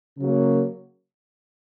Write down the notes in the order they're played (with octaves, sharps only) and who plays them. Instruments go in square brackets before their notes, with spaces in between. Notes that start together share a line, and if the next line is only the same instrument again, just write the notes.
[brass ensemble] C#3 F#3 A#3